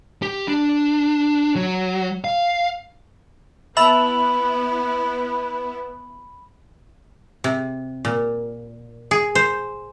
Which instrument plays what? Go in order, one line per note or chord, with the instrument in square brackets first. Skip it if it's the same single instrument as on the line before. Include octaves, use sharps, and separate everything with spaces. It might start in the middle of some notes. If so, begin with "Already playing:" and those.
[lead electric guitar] G4
D4
F#3
F5
[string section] B3 E4 [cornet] B4 [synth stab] E5 A5 E6 [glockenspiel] B5 F#7
[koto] C3
A#2
G#4
C5